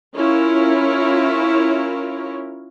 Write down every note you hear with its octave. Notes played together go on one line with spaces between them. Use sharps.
C#4 E4 F4 A#4 C#5